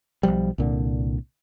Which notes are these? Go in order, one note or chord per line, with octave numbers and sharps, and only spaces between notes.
B1 E2 F3 G3
C2 A#2 D3